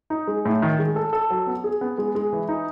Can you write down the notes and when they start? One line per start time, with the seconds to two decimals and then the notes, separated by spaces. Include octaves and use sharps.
0.10 D#4
0.27 G#3
0.45 A2
0.62 D#3
0.79 G#3
0.96 A4
1.13 A4
1.30 F#3
1.47 B3
1.64 G#4
1.81 B3
1.98 G#3
2.15 G#3
2.33 E3
2.49 D#4